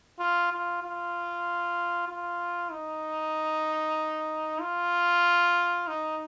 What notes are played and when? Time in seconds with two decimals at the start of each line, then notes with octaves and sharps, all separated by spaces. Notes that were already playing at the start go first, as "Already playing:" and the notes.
0.19 F4
0.52 F4
0.83 F4
2.08 F4
2.72 D#4
4.61 F4
5.88 D#4